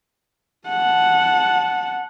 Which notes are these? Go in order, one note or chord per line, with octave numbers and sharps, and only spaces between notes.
F#5 A5